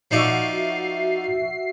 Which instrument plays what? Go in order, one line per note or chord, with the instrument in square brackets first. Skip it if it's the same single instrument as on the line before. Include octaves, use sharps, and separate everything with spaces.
[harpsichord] F3 D#4 D5 [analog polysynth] F#4 E5 C7